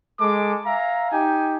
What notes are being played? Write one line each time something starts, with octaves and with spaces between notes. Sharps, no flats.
G#3 A4 D6
E5 F5 G#5 A#5
D#4 G4 G5 G#5